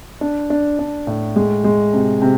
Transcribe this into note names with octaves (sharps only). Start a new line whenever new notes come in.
D4
D4
D4
A2
G#3
G#3
C3
C3